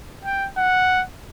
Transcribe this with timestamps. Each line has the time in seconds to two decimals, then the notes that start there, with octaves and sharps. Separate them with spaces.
0.25 G5
0.57 F#5